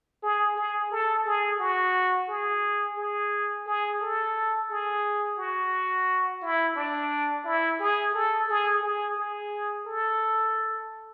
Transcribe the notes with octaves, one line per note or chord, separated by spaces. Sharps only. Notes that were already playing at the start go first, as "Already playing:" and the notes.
G#4
G#4
A4
G#4
F#4
G#4
G#4
G#4
A4
G#4
F#4
E4
D4
E4
G#4
A4
G#4
G#4
G#4
A4